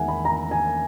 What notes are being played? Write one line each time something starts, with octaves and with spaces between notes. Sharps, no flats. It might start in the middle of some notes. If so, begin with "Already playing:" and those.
Already playing: E2 D#3 G#3 E5 F#5 G#5
B5
A#5
G#5